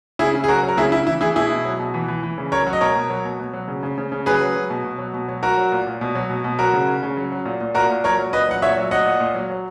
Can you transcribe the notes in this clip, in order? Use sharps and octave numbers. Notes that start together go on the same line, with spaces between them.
C#3 E4 G#4
C#3
G#4
F#3 F#4 A#4
F#3
A#4
C#3 E4 G#4
C#3 E4
E3 E4
E3 E4 G#4
B2 E4 G#4
B2
F#3
B2
E3
E3
E3
C#3
F#3 A#4 C#5
F#3
D#5
B2 A#4 C#5
B2
F#3
B2
B2
F#3
C#3
C#3
C#3
C#3
F#3 G#4 B4
F#3
F#3
B2
B2
F#3
B2
F#3
F#3 F#4 A#4
F#3
A#2
A#2
B2
F#3
B2
B2
F#3 F#4 A#4
C#3
C#3
C#3
F#3
F#3
A#2
A#2
A#2 F#4 A#4
A#2
F#3 A#4 C#5
F#3
A#2 B4 D#5
F#3 F#5
A#2 C#5 E5
F#3
F#3 D#5 F#5
A#2
A#2
F#3
F#3